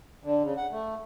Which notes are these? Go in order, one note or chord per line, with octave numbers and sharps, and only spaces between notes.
D3
C#3
F#5
A3